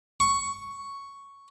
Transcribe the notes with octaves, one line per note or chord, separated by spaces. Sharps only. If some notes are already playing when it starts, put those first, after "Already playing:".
C#6